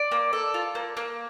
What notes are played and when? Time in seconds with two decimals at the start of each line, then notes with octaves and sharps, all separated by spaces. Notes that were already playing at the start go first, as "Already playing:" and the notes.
Already playing: D5
0.12 A#3
0.33 A4
0.54 F4
0.75 A#3
0.97 A#3